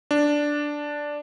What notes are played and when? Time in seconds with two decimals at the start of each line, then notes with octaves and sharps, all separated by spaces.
0.11 D4